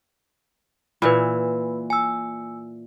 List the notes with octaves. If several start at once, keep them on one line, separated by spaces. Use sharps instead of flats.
A#2 E3 B4 B5
G#5 E6